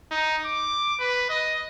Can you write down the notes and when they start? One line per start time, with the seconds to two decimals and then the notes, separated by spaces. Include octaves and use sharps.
0.11 D#4
0.46 D6
1.00 B4
1.30 D#5